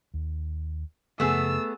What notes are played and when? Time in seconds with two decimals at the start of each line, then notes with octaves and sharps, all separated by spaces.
0.14 D#2
1.20 F#2 C#3 F3 A3 B3 G#4 E6